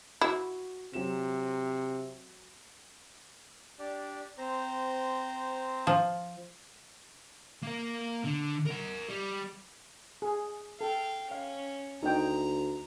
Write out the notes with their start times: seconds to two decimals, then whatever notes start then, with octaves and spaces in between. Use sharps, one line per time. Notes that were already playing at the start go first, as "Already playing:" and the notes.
0.21 E4 F#4
0.93 C3 F#3 E7
3.79 D4 G4 D5
4.38 C4 C5 A#5
5.87 F3
7.63 A#3 A#4
8.24 D3
8.66 A#4 F#5
9.09 G3
10.22 G#4
10.81 A4 F5 G5
11.31 C#4 F5
12.03 D2 D#4 G5 A#5